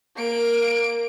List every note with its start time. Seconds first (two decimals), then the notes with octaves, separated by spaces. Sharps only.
0.16 A#3 D7